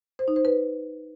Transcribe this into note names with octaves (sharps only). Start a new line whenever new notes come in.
C5
D#4
C5
B4